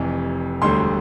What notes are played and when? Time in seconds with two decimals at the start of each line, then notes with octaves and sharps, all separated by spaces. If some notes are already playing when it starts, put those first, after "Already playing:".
Already playing: F1 F2 C3 E3
0.62 E1 D2 D3 G3 C6